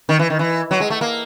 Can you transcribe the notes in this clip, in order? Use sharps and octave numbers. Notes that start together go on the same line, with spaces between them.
D#3
E3
D#3
E3
F#3
G#3
A3
A#3